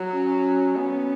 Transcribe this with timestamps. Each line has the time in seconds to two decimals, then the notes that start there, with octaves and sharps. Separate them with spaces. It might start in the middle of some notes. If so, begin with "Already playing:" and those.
Already playing: F#3
0.14 C#4
0.76 B3 C#4